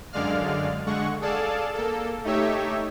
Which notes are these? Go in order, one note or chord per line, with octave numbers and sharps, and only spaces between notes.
F#2 D3 G#3 D5 F5 F6
D3 G#3 F#5 C#6
G#4 A4 D5 F5 A5
A#3 A4
A3 D#4 G4 C#5 E5